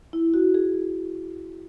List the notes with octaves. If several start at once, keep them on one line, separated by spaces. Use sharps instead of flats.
E4
F#4
G#4